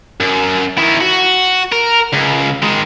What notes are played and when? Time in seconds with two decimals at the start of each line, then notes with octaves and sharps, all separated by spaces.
0.20 F#2
0.78 D#3 E4
1.01 F#4
1.72 A#4
2.13 C#2
2.63 D#3 G#3